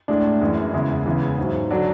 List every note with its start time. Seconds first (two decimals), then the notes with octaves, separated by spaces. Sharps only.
0.08 A2 G#3 D4
0.41 F#2 E3 G#3
0.74 E2 C#3 G#3 E4
1.05 E2 C#3 E3 G#3
1.38 G#2 F#3
1.71 D3 F#3 D4